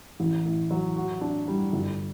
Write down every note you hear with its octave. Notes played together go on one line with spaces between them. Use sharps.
A1
A2
F#3
F#4
D4
G3
G1